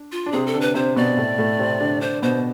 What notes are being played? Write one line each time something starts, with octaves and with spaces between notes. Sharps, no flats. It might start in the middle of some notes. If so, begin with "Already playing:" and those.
Already playing: D4
F4
D4
C3 C4 G#4
A4
D3 D4
B4
C3 C4 C5
B2 B3 D5
A2 A3
A2 A3
C3 C4
D3 D4
D3 D4 C5
B2 B3 C5